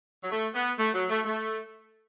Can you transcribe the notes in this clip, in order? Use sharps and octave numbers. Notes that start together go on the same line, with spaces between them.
F#3
A3
B3
A3
F#3
A3
A3